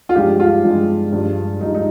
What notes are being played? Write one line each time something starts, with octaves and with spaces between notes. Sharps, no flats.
F4
G2 F3 G#3 G4
F4
G2 F3 G#3
G2 F3 G#3
G2 F3 G#3 D#4
D#4